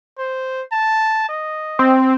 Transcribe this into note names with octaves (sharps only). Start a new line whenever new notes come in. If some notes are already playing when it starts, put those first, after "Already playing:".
C5
A5
D#5
C4